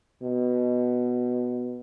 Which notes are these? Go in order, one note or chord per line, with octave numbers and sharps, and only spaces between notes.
B2